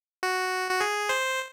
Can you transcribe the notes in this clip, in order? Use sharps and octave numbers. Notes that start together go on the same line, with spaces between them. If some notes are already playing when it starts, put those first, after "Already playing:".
F#4
F#4
G#4
C5